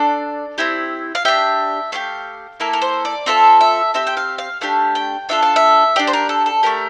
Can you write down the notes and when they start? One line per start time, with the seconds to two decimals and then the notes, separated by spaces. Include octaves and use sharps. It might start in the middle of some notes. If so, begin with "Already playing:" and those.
Already playing: D4 A4 D5
0.58 C4 E4 G4
1.15 F5
1.25 D4 G4 E5
1.92 A3 E4 G4 F5
2.60 A#3 E4 A4 A#4
2.73 A#4
2.82 C5
3.05 D5
3.26 C4 F4 A4 E5
3.61 E5
3.94 C4 G4 E5
4.07 G5
4.17 F5
4.38 F5
4.61 A3 D4 G4 F5
4.95 G5
5.29 D4 F4 A4 E5
5.42 F5
5.56 E5
5.96 D4 G4 D5
6.07 C5
6.13 A#4
6.29 A4
6.46 A4
6.63 A3 C4 G4 A#4